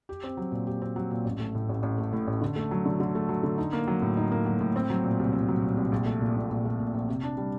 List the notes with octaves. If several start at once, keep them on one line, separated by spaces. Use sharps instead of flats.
G4
C4
F#3
A#2
G4
C4
F#3
A#2
A1
A3
A2
A1
A1
A3
A2
A1
D3
A3
F#3
D3
D3
A3
F#3
D3
D#4
A#3
F#3
A2
D#4
A#3
F#3
A2
C4
F#3
A#2
C2
C4
F#3
A#2
C2
A#1
A3
A#2
A#1
A#1
A3
A#2
A#1
C3
D4
G3